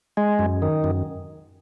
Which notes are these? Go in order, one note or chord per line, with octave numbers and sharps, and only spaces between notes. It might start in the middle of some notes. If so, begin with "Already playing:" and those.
G#3
F#2
D#3
F#2